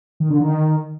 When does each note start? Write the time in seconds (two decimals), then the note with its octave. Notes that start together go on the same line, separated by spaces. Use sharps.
0.20 D#3
0.30 D3
0.40 D#3